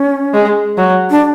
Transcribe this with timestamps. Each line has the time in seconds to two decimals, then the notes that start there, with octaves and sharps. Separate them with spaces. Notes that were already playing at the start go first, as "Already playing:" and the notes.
Already playing: C#4
0.34 G#3
0.78 F#3
1.10 D4